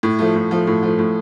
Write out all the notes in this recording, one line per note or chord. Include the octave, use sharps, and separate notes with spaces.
A2
F3 A3
A2
F3 A3
A2
F3 A3
A2